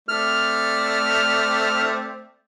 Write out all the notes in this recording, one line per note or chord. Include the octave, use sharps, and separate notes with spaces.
A3 C4 D5 F6